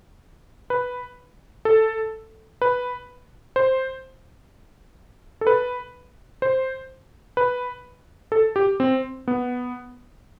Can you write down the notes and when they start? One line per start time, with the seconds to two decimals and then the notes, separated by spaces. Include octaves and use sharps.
0.70 B4
1.65 A4
2.62 B4
3.56 C5
5.41 A4
5.47 B4
6.42 C5
7.37 B4
8.32 A4
8.56 G4
8.80 C4
9.28 B3